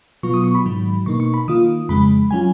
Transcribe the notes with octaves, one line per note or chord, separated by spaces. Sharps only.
B2 F#3 B3 F4 C#6
D#6
C#6
B5
G#2 D#3 F#3
B2 A#3 D#4 C#6
C#6
B5
D#3 A#3 F4 D#6
F2 C#3 G#3 B5
F#3 C#4 F4 G#5